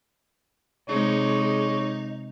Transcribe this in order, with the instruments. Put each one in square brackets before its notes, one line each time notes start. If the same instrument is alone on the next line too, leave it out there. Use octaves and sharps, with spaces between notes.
[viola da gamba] C3 G#3 [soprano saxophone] D#4 [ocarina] G#4 [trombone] C#5